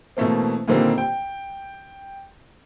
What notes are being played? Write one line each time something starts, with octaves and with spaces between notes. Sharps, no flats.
B2 E3 A3 A#3 C4
A#2 D3 D#3 G3 A#3 C4
G5